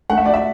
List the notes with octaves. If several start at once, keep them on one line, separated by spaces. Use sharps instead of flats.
A3 F#5
E5
D5
E5